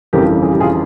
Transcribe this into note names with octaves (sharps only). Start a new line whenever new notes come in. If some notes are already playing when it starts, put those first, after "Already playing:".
G1 F2 C#3 E3 G4 A#4
G#4
G4
F4 G#4